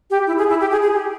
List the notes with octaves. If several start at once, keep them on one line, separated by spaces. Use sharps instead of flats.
G4
E4
G#4
E4
G4
G#4
G#4
G4